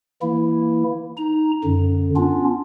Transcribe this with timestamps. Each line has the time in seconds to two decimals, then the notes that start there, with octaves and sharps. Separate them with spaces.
0.22 E3 A#3 E4
1.17 D#4 A#5
1.64 F#2 D3
2.16 B3 C#4 D4 F4